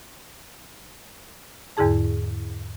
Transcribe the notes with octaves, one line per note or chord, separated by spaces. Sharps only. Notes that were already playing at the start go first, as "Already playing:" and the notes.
E2 G#2 D3 E4 G#4 A5